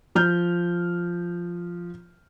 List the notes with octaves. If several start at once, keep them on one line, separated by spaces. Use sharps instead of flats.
F3 F6 G6